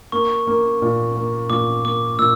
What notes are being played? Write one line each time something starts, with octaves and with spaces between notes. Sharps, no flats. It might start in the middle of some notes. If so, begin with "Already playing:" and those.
A#3 C#6
A#3
A#2
A#3
A#2 D6
A#3 D6
A#2 E6